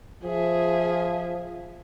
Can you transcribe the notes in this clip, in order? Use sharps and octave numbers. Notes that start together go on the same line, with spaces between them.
F3 G#4 E5